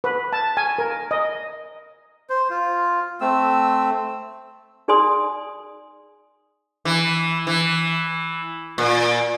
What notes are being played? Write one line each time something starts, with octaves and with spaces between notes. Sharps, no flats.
B4
A5
G#5
A#4
D#5
C5
F4
A3 C4 E6
D#4 G#4 D5 G#5 C6 D#6
E3
E3
A#2